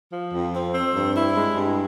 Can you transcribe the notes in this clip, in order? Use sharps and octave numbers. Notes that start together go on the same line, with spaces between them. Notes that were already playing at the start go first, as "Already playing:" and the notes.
F3
F2
C4
C4
G2
E4
G#3
G2